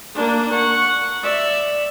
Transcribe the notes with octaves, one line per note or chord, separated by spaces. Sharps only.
A#3 D4
F#5 C#6
D5 E5